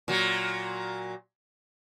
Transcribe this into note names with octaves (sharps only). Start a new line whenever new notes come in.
A#2 F#3